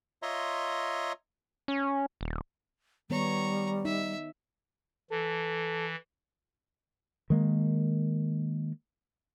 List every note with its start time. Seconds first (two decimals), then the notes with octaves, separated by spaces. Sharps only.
0.22 F4 C#5 D#5 E5 A#5 C6
1.68 C#4
2.21 D#1
3.10 D#3 G3 B3 C#5 A#5 C#6
3.85 D#4 E5
5.10 E3 A4
7.30 D#3 G#3 A#3